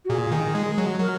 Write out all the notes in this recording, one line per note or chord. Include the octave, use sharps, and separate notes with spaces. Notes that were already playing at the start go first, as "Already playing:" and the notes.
F#4
A#2 G#4
D#3
G#3
F#3
F#3 A#4